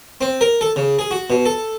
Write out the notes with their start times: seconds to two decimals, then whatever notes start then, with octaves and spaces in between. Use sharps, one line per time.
0.21 C4
0.41 A#4
0.61 A4
0.76 C#3
0.99 G#4
1.11 F#4
1.30 B2
1.46 A4